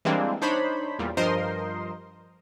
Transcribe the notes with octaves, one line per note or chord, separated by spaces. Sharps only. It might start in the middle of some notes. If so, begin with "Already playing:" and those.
E3 G3 G#3 A#3 C4 D4
D4 D#4 C5 C#5 B5
E2 A#2 G3
G2 F3 A#4 C5 D#5 C6